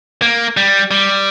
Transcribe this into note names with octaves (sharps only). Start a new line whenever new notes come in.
A#3
G3
G3